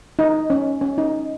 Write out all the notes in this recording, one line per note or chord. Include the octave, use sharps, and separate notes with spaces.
D#4
C#4
C#4
D#4